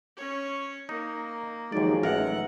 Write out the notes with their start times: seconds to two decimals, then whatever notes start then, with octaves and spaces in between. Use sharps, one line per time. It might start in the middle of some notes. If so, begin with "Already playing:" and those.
0.17 C#4 C#5
0.89 A#3 D#4
1.72 D#2 F3 F#3 G#3 D#4 D5
2.03 A1 A#4 E5 F#5